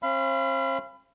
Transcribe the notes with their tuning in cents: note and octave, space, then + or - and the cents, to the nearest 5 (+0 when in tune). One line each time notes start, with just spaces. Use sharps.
C4 +40 F5 -35 B5 +20